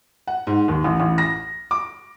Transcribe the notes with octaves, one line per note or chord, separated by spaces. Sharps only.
F#5
G#2
D#2
A1
A1
A#6
D6